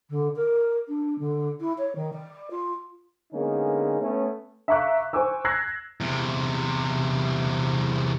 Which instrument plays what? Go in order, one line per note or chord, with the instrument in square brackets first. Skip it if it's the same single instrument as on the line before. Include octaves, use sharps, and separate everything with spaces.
[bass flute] D3
A#4
D4
D3
E4
C#5
D#3
D5
F4
[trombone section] D3 G#3 A#3 B3 C#4 D#4
A3 B3 C#4
[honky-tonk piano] E5 F5 A#5 C#6 D6 F#6
C5 G#5 C#6 D6 E6
E6 F#6 G#6 A#6 C7
[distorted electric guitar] E2 C3